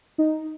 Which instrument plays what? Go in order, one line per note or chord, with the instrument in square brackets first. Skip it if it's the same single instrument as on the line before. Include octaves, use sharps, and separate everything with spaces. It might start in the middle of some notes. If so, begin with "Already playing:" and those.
[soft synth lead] D#4